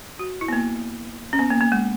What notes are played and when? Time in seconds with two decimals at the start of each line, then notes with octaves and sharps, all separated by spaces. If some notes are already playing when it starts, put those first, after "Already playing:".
0.19 F#4
0.41 E4
0.48 B3
0.53 A#3
1.33 C#4
1.39 B3
1.50 A#3
1.61 A#3
1.72 G#3